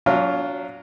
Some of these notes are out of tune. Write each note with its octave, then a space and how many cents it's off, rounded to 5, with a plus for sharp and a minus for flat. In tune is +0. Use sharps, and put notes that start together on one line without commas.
F#3 +0 D4 -40 F4 +0